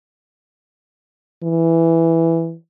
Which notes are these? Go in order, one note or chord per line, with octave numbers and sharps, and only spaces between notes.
E3